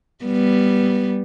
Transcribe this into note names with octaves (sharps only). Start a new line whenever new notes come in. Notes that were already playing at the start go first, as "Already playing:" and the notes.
G3 B3